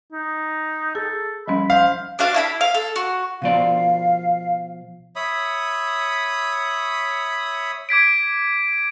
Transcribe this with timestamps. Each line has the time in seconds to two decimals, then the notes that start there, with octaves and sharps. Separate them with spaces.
0.13 D#4
0.95 G#4 A4
1.48 F3 G3 C#4 B5
1.70 C5 F5
2.19 D4 F#4 F5 A5
2.34 E4 A5 B5
2.61 F5
2.74 A4
2.96 F#4
3.42 B2 F3 D5 F5
5.16 C#5 E5 B5 D#6
7.89 D6 G#6 B6 D7